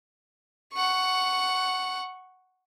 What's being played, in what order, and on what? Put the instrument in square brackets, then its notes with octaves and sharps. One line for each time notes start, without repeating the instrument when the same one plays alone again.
[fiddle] F#5 C#6